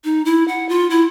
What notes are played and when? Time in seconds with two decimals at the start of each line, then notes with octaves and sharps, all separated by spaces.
0.04 D#4
0.25 E4
0.48 F#5
0.69 F4
0.90 E4